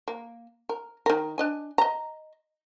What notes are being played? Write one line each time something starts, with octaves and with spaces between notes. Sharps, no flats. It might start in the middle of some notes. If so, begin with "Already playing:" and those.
A#3
A#4
D#3 A#4
D4 D#5 G#5
D#5 A#5